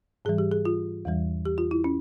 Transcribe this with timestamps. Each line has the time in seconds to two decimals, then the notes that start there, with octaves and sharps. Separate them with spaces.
0.25 G#2 E3 G3 G#4
0.38 G4
0.52 G#4
0.65 F4
1.05 E2 E3 G3
1.45 G4
1.58 F4
1.71 E4
1.84 C#4